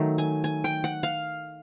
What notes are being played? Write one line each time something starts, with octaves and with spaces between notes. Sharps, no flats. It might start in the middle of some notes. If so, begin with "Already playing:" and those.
Already playing: D#3 F#3 A3
G#5
G#5
G5
F#5
F5